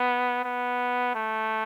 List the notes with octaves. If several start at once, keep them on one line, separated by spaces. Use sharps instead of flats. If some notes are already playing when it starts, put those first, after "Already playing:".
Already playing: B3
B3
A3